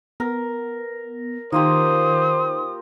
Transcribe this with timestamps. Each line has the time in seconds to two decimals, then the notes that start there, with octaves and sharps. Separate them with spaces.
0.20 B3 A#4
1.52 D#3 A#3 F4 G4 C5 D#6